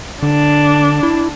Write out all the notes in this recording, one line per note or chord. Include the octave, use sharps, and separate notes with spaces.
D3 D4
E4